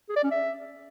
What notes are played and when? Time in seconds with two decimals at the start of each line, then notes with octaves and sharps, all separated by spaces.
0.09 G#4
0.16 D5
0.23 C#4
0.31 E5